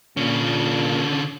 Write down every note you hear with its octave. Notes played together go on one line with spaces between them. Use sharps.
A#2 D3 C#4